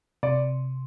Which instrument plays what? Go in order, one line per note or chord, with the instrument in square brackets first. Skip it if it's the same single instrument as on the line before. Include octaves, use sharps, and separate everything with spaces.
[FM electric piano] C3 [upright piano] D5